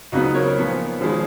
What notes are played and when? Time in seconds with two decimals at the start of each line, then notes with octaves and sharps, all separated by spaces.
0.12 C#2 C#3 F#3 B3 D#4 F#4
0.23 D#4
0.34 A#4 C#5
0.46 A#4 C#5
0.57 A#2 F3 B3
1.01 G#1 F3 G#3